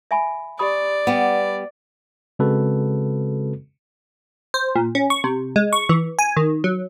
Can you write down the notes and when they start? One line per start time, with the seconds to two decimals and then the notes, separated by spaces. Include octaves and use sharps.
0.11 E5 G#5 B5
0.59 G4 D5 B5 D#6
1.07 G3 B3
2.39 C#3 G#3 C4 F#4 A4 B4
4.54 C5
4.76 A#2
4.95 C#4
5.10 C#6
5.24 C3
5.56 G#3
5.73 C#6
5.89 E3
6.19 G#5
6.37 D#3
6.64 F#3